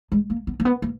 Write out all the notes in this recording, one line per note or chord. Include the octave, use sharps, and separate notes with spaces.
G#3
A#3
B3
A#3
B3
A#3